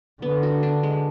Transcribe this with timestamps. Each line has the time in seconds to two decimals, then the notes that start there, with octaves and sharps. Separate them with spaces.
0.22 D3 B3
0.43 F#4
0.63 D4
0.83 G#3